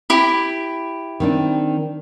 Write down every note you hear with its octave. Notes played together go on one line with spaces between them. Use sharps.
E4 G4
D#3 C4 D4